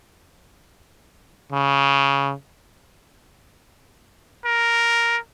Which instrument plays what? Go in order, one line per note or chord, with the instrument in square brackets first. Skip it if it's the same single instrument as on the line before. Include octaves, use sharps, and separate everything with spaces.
[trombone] C#3
[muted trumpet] A#4